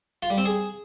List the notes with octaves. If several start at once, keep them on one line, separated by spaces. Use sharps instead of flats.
F4
G3
C4
G#4